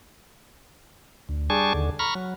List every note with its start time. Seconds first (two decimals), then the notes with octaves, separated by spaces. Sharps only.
1.29 D2
1.50 G3 D4 G#4 G#5 A5 C#6
1.74 D#2 D3
1.99 A#5 B5 C#6 F6
2.15 F#3